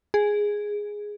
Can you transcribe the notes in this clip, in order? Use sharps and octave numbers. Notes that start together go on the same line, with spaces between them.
G#4